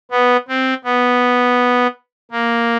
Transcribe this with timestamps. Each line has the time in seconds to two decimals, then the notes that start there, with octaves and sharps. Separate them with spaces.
0.11 B3
0.48 C4
0.85 B3
2.31 A#3